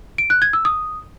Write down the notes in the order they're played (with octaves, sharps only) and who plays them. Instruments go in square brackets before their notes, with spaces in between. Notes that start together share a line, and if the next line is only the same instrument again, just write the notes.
[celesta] D7
F#6
G#6
E6
D#6